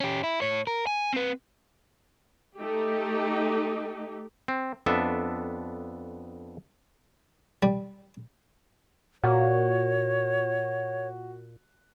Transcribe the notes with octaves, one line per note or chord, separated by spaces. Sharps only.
C#4 G4
E4
A2 C#5
A#4
G#5
C4 B4
A3 D#4 G4
C4
F2 B3 D4 A4 E5
G3
A#2 F#4 C#5